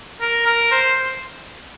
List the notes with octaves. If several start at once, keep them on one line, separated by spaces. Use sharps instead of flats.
A#4
A#4
C5